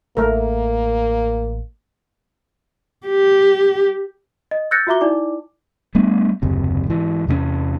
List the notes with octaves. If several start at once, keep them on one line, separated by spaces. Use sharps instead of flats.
A1 A3 A#3 A#4
G4
D#5
E6 F#6 G6 A6 A#6 C#7
F4 F#4 E5 A#5 D6 G7
D#4 E4 D5 D6
G3 A3 B3 D4
F#1 D#2 C3
G#2 E3
E2 C3 A3 C#4